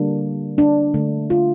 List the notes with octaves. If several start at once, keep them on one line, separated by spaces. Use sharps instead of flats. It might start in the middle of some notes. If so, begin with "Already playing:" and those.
Already playing: D3 G3 A#3 D4
D4
D3 A3
F4